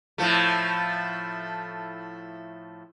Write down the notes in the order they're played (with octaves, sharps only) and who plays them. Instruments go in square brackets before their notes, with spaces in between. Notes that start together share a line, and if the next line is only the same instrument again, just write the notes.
[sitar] A2 F3 A3